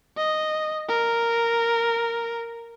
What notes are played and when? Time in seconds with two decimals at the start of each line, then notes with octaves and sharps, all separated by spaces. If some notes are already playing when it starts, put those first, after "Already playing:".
0.17 D#5
0.89 A#4